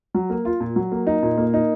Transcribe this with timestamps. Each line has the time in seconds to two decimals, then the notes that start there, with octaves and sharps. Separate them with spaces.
0.15 F#3
0.30 A#3
0.45 F4
0.60 A#2
0.76 F#3
0.92 A#3
1.07 D#4
1.23 A#2
1.38 A#3
1.54 D#4